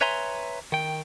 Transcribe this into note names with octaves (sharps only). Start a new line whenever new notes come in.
B4 C#5 E5 G#5 A#5 C6
D#3 G5